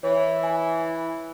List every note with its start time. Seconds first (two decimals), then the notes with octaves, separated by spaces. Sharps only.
0.03 E3 C#5
0.43 G#5